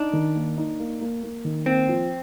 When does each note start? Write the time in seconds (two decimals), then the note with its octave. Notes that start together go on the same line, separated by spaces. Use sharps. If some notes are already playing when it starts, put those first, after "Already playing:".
Already playing: D4 D#4
0.13 D#3
0.36 A#3
0.57 D#4
0.80 A#3
1.01 A#3
1.23 A#3
1.45 D#3
1.66 A#3 C4
1.89 F3